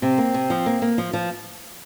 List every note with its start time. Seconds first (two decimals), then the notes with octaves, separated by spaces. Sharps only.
0.02 C3 C4
0.18 A#3
0.34 C3
0.50 F3
0.66 A#3
0.82 A#3
0.98 F3
1.13 F3